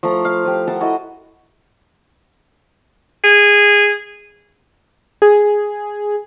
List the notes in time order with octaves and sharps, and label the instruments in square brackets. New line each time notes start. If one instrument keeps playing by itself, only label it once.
[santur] F3 A3 A#5 C6
F5
F3 G4
A4 A#4 E5 F#5
E4 F#4 A4 D#5
[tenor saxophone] G#4
[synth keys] G#4